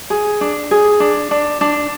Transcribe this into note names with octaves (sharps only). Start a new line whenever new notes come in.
G#4
D4
G#4
D4
D4
D4